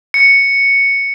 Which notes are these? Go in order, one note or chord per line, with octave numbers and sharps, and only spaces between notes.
C#7